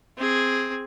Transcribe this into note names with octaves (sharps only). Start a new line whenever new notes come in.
C4 G#4